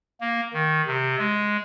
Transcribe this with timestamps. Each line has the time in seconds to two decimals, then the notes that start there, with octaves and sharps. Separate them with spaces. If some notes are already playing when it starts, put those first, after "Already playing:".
0.21 A#3
0.53 D#3
0.87 C3
1.18 G#3